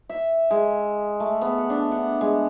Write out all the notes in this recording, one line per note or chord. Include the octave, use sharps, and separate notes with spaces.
E5
G#3
A3
B3
F#5
D4
F#5
G#3